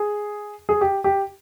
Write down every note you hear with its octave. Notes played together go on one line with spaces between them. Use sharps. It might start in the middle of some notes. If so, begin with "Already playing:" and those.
Already playing: G#4
G#4
G4
G4